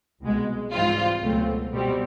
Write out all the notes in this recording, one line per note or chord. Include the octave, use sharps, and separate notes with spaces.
C2 B2 G#3
G#2 E3 G3 C4 F4
C#2 B2 F#3 A3 C4
B2 G3 C4